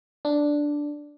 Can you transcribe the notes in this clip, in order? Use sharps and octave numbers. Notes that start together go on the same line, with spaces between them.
D4